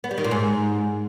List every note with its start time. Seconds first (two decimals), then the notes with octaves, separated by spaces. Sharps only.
0.04 B3
0.11 G3
0.18 D#3
0.24 A#2
0.31 G#2